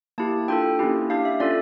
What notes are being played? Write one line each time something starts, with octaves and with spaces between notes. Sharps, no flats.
A#3 E4 G4 A5
D4 F4 A4 G5
A#3 C#4 E4 G4
D4 G4 F5
E5
C#4 F4 A4 D5